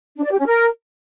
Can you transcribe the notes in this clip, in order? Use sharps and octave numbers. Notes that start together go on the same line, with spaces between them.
D4
D5
G4
C#4
A#4